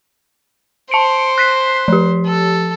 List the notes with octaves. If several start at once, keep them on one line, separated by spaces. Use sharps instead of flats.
C5 A5 C#7 D7
F#6 B6 C7
F3 G4
A4